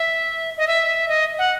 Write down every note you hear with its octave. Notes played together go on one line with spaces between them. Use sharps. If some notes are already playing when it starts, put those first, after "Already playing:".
Already playing: E5
D#5
E5
D#5
F#5